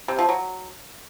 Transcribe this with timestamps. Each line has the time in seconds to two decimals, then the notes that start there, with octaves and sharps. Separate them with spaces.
0.08 C3
0.19 F3
0.29 F#3